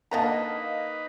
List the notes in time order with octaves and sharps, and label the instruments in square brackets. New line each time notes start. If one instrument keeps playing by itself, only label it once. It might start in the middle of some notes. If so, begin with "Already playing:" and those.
[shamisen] D3 D4 A#5 [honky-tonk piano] A#3 D#5 [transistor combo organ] D#4 B4